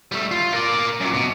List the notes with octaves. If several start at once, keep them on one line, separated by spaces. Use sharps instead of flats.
G3 A3
F4
A#4 D5
F#2 A#2
B2